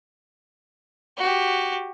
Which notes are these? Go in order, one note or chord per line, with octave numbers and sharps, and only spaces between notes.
F#4 G4